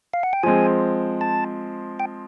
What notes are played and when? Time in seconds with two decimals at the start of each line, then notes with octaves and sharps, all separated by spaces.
0.13 F5
0.23 F#5
0.33 G5
0.43 F3 G#3 C4 G#5
1.21 A5
2.00 G5